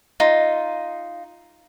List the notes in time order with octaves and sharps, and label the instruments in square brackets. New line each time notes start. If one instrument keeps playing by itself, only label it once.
[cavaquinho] D#4 F4